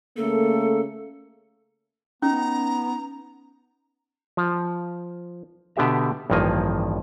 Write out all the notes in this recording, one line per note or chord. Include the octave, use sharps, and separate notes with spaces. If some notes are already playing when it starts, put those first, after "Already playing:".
C#3 A3 A#3 A4
B3 C#4 D#4 A#5
F3
B2 D3 B3 G4 E5 A#5
A1 G2 D#3 F3 A#3 G#5